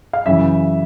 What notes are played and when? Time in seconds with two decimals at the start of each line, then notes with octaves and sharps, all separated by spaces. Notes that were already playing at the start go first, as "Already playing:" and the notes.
0.13 F5
0.26 F#2 C#3 E3 E5